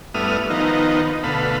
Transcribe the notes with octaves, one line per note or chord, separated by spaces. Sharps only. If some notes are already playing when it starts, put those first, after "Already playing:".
G2 A3 B3 E4 D#6 F6
D#3 F3 B3 D#4
D2 B2 A4 F5 B5